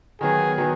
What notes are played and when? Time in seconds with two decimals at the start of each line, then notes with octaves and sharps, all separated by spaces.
0.21 D#3 F#3 B3 F#4 G#4
0.58 D#3 F#3 B3